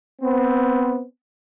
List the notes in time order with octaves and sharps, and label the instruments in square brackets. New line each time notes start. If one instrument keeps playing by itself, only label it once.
[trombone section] B3 C4